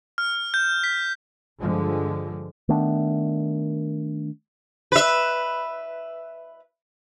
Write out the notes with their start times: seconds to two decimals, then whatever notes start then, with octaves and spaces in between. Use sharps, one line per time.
0.18 F6
0.54 G6
0.84 B6
1.60 G2 D3 F3 G#3
2.69 D#3 A3 B3 D4
4.92 B4 E5